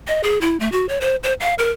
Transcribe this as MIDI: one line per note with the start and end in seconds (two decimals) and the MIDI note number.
0.07 0.21 75
0.23 0.40 68
0.41 0.59 64
0.60 0.71 57
0.72 0.86 66
0.89 0.98 73
1.01 1.16 72
1.23 1.34 72
1.40 1.54 77
1.59 1.71 70